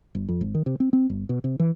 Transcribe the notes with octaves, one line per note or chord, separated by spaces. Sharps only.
G1
F2
G#1
D#3
C3
C4
C4
G1
B2
C3
E3